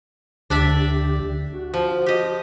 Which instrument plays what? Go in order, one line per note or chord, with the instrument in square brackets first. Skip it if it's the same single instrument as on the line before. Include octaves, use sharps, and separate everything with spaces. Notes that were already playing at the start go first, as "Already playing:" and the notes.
[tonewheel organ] D2 D3 G4 [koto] D4 D5 E5
[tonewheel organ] F#4
[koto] F3
G4 D#5